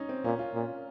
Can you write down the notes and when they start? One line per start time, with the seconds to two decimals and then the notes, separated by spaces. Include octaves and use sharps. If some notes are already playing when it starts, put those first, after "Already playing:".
Already playing: C#4 D#4
0.09 C4
0.24 A#2 C#4
0.39 F4
0.54 A#2